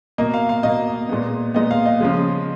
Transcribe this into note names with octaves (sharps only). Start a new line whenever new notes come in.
B2 A#3 D#5
F5
F5
B2 A#3 D#5
A#2 G#3 B3
A#2 G#3 B3 D#5
F5
D#5
C#3 F3 G#3